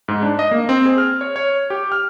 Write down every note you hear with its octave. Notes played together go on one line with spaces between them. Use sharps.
G#2
D4
D#5
A#3
C4
G#4
F6
C#5
C#5
G4
F6